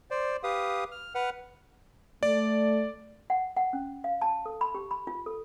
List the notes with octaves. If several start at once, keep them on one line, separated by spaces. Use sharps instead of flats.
C5 D5
G4 B4 F5 D#6
F6
B4 F#5 F6
A3 D5
F#5
F#5
C#4
F5
A5
A4
B5
G4
B5
F4
A4